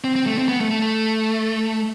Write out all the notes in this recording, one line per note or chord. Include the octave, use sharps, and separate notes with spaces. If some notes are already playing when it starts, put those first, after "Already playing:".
C4
C4
A3
C4
B3
A3
A3
A3